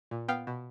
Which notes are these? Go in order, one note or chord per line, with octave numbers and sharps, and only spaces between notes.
A#2
B3 F5 G5
B2